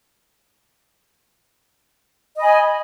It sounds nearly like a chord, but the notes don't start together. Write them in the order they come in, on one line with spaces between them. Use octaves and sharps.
D#5 B5 G#5